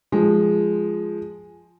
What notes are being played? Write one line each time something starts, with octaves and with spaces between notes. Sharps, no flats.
F3 G#3